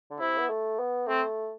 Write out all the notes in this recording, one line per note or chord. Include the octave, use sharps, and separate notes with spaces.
D3
C3 E4
B3
A3
B3
A3 C4